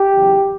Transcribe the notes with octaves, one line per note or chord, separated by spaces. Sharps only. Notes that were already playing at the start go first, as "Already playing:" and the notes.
Already playing: G4
E2 C#3 F#3